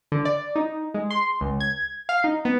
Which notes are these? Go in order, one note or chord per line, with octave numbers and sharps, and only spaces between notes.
D3
D5
D#4
G#3
C6
C#2
G#6
F5
D#4
B3